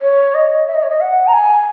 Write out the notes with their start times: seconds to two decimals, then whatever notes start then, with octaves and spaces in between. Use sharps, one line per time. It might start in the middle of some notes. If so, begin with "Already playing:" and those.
0.02 C#5
0.35 D#5
0.67 E5
0.75 D#5
0.83 C#5
0.90 D#5
1.01 F#5
1.27 A#5
1.33 G#5